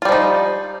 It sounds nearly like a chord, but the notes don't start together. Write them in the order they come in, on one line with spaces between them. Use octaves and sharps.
F4 G3 F3 D#4